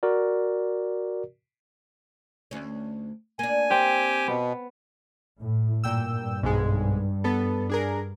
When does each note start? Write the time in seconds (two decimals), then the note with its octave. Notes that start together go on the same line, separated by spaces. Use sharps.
0.03 F#4 A#4 D5
2.51 D2 C#4
3.39 A#3 D4 G#5
3.70 C4 G4 G5
4.28 B2 B3
5.40 A2
5.84 G2 A#2 G5 E6
6.43 B1 G#2 G#3
7.24 B3 A4
7.69 D4 G#4 A#4